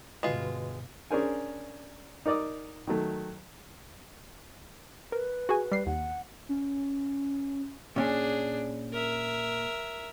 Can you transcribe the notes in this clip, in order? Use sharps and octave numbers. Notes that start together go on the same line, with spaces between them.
G2 B2 D3 G#3 F4 F#4 B4
C#4 D4 G#4 A#4 C5 G#5
D#4 A#4 D5 D6 D#6
D#3 F#3 A3
A#4 B4
F#4 G#4 G#5
G3 C7
D#2 F#5
C#4
A#2 C#4 D4 G#4
A#4 E5